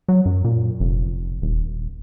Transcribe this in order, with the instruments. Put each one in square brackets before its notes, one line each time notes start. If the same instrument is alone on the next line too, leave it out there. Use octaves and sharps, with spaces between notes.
[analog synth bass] F#3
F#2
A#2
F1
D#1